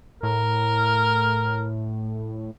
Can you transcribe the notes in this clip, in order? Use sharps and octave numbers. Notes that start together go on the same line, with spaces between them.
A2 A#4